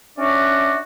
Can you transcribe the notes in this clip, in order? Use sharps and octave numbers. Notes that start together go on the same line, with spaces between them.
C#4 D4 F#4 D5 E5